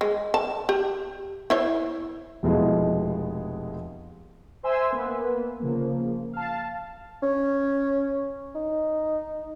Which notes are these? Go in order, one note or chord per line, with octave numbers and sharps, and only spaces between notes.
G#3
A5
G4
E4 C5 C#5
F1 B2 F3 G#3 E4 D#5
C5 E5 G#5 C6 E6
A#3 B3 B4
C#3 F3 A#3
F5 A5
C#4
D#4